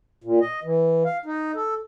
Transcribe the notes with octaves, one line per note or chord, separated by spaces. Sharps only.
A#2
D#5
E3
F5
D#4
A4